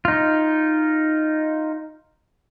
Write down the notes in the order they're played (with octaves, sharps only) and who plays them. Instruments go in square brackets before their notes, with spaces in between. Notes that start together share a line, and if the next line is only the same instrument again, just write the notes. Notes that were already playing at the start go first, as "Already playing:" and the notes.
[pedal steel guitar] D#4 F4